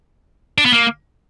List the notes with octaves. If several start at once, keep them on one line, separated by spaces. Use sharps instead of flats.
D4
B3
A#3